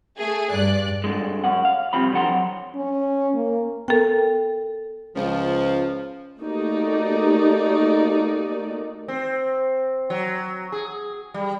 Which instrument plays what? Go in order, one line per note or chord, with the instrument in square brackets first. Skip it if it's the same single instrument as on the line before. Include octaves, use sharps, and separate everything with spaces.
[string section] A3 G#4
[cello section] G2 [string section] D5 F#6
[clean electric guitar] G2 D3 G#3
F#2 C#4 F#5
F5
C2 C3 F3 C4 B5
D3 F3 C5 F#5 A#5 C6
F#3
[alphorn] C#4
A#3
[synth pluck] B3 A#4 [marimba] A4 G5
[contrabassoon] C#2 [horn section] F3
[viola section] A3 A#3 D#4 F#4 G4 D5
[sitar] C4
F#3
G#4
G3